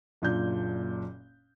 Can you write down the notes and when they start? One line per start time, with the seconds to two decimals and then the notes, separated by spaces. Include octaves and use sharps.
0.22 F#1 A#2 D4 G6